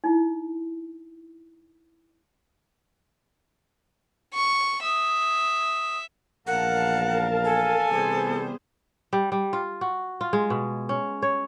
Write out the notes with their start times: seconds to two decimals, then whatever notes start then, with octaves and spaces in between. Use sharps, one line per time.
0.04 D#4 E4
4.34 C#6
4.83 E5 D#6
6.47 A#1 E2 A#4 F5 F#5 A5
7.45 A4 G#5
7.90 C3 E3 G3 B3 G#4 C5
9.13 G3
9.32 G3
9.53 F4
9.81 F#4
10.21 F4
10.33 G#3
10.50 B2
10.89 C#4
11.22 C#5